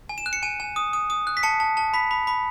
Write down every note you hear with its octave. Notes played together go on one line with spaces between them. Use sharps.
G#5
E7
F#6
C#7
G#5 D#7
G#5
D#6
D#6
D#6
F#6
B6
A5 C#7
A5
A5
B5 B6
B5
B5